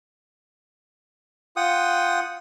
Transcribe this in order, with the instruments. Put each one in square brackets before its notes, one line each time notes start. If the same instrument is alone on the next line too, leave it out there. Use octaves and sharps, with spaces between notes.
[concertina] F4 F#5 G5 D#6